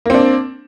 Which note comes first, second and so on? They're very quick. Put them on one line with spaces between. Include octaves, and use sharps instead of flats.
A#3 C4 D4